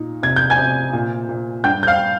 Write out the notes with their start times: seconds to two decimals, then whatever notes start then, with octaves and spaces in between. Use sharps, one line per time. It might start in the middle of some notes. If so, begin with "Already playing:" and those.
Already playing: A#2 D#4
0.23 C3 G#6
0.36 G6
0.50 G#5 G#6
0.58 C3
0.93 A#2
1.29 A#2
1.64 G2 G5 G6
1.83 G6
1.87 F5 F6